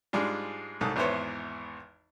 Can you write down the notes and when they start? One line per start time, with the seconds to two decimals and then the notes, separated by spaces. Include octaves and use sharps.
0.13 G#2 G3 G#3 D4 F4
0.81 C2 G#2 A4 D#6
0.96 G#1 E2 B3 E4 C5 C#5